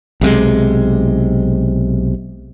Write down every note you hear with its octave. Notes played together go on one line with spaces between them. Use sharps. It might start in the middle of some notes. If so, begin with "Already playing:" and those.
B1 C3 G#3